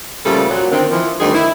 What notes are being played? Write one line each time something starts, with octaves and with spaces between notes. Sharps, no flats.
A#2 C#3 F3 G3 A3 A4
A#2 F#3
A#2 D3 D#3 C4
E3 F3
D2 G2 D#3 C4 G#4
E4